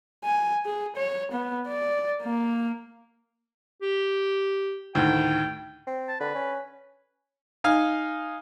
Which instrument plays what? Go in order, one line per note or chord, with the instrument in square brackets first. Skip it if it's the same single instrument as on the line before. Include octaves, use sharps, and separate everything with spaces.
[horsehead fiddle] G#5
G#4
C#5
B3
D5
A#3
[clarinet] G4
[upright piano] D2 A2 D#3 [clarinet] G5
[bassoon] C4
[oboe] A5
[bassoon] D3 [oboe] B4
[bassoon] C#4
[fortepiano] D#4 F5 G#5 F6